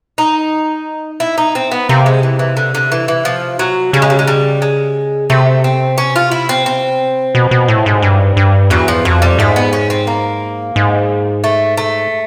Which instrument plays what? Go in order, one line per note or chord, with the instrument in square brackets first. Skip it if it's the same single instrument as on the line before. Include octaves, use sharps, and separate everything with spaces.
[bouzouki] D#4
E4
D#4
C4
B3
[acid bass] C3 [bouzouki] A#3
[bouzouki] G#3
E3
E3
D3
D3
E3
E3
F3
F#3
[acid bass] C#3 [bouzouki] G3
[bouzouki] G#3
G3
G#3
G3
G#3
[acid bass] C3 [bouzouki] A3
[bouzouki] C4
C#4
F4
E4
C4
C4
[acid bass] B2
B2
A2
G#2
G2
G2
[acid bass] E2 [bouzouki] F#3
[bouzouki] F3
[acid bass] F2 [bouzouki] F#3
[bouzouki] G3
[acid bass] G#2 [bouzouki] A3
[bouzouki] B3
C#4
C4
A#3
[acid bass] G#2
[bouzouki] A3
A3